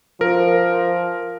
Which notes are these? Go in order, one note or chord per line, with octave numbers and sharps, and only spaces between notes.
F3 A#4